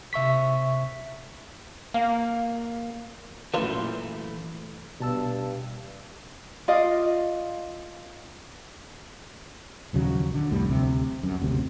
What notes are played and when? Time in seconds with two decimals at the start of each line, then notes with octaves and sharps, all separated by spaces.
0.13 C3 E5 C#6 B6
1.94 A#3 F5
3.54 F#2 A#2 E3 A3 F4 B4
5.00 G2 B2 A5 E6
6.68 F4 D5 D#5 F5
9.93 A#1 D#2 C#3 F#3
10.34 D3
10.51 C2 F2 A2 G3
10.69 D2 C3
11.23 F#2
11.40 F#1 D2 C3